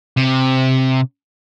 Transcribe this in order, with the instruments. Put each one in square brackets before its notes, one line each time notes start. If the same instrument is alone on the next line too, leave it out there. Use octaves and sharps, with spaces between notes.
[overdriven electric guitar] C3